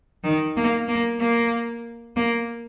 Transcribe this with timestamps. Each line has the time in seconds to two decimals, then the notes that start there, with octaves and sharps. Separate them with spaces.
0.24 D#3
0.56 A#3
0.88 A#3
1.20 A#3
2.16 A#3